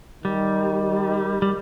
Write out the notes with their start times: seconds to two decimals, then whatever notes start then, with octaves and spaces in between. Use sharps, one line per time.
0.24 D#3 G3
1.42 G3